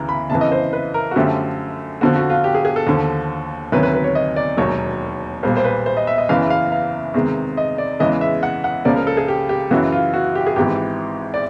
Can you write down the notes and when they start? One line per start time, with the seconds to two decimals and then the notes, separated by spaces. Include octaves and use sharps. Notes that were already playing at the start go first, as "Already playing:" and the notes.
Already playing: D2 C#3 E3 A#5
0.09 B5
0.30 F#1 F2 C#3 E3 A5
0.41 D#5
0.52 C5
0.73 B4
0.94 A#4
1.11 F#4
1.16 F#2 D3 F3 A3 G4
2.01 F2 D3 F3 F#4
2.16 F#4
2.30 F4
2.44 G4
2.55 G#4
2.65 G#4
2.76 A4
2.87 D#2 D3 F3
3.72 D2 C3 D#3 F#3 B4
3.83 B4
3.94 B4
4.04 C#5
4.15 D#5
4.36 D5
4.57 E1 D#2 D#3 F#3 C#5
5.43 B1 A#2 G3 C5
5.57 C5
5.65 B4
5.86 C5
5.97 D#5
6.07 E5
6.18 D#5
6.29 F#1 E2 C#3 E3 F5
6.50 F5
6.72 F5
7.14 E2 C3 D#3 G#3
7.57 D#5
7.78 D5
8.00 E2 C#3 E3 G#3 D#5
8.21 E5
8.43 F#5
8.64 F#5
8.85 C#2 C#3 F3 A#3 D5
8.96 A#4
9.07 A4
9.17 G#4
9.28 G4
9.49 G4
9.71 F#2 C#3 E3 F#4
9.92 F4
10.14 F#4
10.35 G4
10.47 G#4
10.56 G#1 G#2 E3 G4
11.34 D5